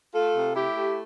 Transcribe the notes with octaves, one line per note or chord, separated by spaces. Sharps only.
A3 F4 A4
C3
A3 E4 G4
A3